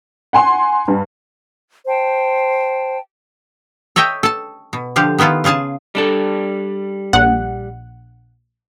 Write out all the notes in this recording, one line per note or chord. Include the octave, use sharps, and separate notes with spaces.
F#5 G#5 C6
G2
C5 G5 A5
A4 C#5 D#5 E5 G5
A4 A5
B2
D3 F3 G4 F5
D#3 B3 E4 F4 A4
C#3 F4 G#4 F5 A5
G3 D4 A4
A#1 F#5